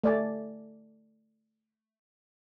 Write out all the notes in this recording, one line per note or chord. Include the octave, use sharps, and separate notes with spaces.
A3 D5 G#5